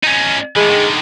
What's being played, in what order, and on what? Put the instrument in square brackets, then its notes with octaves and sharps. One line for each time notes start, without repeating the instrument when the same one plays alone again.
[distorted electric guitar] C#4 D#4
[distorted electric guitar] A2 E3 [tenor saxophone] G#3
[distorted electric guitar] D3 D#3